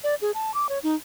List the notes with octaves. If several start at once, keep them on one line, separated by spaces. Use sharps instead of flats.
D5
G#4
A5
D6
C#5
D#4